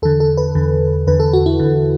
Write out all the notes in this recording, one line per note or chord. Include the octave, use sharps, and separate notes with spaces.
E2 D3 A4
A4
B4
E2 D3
E2 D3 B4
A4
F#4
E4
E2 D3